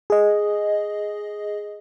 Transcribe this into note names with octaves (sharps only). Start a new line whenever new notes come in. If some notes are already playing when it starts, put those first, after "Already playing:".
G#4 D#5